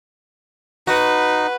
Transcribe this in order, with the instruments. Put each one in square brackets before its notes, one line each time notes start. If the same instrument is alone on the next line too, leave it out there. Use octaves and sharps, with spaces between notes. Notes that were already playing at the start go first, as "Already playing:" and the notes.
[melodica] D#4 [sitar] F#4 [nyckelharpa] B4